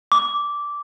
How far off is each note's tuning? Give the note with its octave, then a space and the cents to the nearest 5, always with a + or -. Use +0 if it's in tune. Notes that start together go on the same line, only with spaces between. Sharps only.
D6 -10